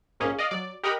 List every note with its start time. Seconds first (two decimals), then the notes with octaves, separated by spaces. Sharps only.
0.20 A#1 G#2 A#3 C#4 G#4
0.38 D5 D#5 F5
0.51 F#3 D5
0.83 G4 A#4 D#5 F#5 A#5 B5